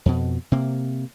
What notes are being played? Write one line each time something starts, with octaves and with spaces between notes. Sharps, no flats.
F2 B2
C3 A#3